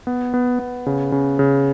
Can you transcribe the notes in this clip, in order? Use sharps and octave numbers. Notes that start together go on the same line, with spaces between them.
B3
B3
B3
C#3
C#3
C#3